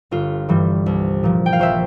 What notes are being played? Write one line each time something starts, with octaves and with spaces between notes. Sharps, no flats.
G1 F4
G2 E3 G3
C2
A#2 F3
G5
F5
A#1 C5 E5